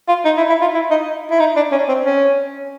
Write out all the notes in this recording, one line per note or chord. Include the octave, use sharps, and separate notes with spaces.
F4
D#4
E4
E4
F4
E4
D#4
E4
D#4
D4
C#4
C4
C#4